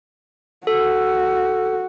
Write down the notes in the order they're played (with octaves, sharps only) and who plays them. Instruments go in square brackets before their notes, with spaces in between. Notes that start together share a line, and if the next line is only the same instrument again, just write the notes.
[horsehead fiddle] F#4 [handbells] A4